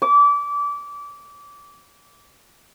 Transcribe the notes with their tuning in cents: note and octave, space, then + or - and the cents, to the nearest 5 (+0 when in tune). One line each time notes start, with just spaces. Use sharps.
D6 -25